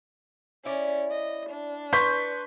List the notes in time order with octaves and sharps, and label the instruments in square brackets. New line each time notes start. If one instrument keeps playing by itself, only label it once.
[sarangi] C#4 [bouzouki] E4 D5
[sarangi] D#5
D4
[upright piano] B4 C6 C#6 [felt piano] G6 B6